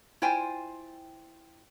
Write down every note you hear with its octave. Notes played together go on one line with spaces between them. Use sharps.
E4 F4 C5 G5 G#5